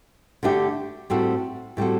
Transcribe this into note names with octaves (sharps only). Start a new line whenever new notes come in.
D3 A3 D4 G4
A2 G3 C4 F#4 A4
A2 G3 C4 F#4 A4